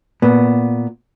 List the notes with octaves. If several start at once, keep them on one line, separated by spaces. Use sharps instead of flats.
A#2 B3